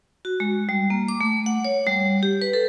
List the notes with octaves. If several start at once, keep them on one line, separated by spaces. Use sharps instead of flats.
F#4
G#3
G3
A#3
D6
A3
F#5
C#5
G3
G4
B4
A4